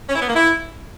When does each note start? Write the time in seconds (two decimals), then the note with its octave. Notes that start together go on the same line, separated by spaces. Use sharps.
0.09 C#4
0.15 E4
0.22 B3
0.28 A#3
0.35 E4